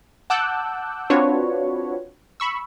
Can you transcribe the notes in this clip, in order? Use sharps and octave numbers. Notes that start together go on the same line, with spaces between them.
F#5 A5 D6 E6 F#6 G6
C4 D4 F4 F#4 B4 C#5
B5 C#6 E6